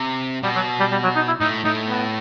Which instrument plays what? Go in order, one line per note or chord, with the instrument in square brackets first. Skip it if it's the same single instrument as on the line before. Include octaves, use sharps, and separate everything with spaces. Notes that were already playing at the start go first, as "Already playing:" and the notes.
Already playing: [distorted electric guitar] C3
[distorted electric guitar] B2 [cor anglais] G3
[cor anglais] F#3
G3
G3
F#3
D#4
E4
[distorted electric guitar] A2 [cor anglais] D#4
[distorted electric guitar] A2 [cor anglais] D#4
[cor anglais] B3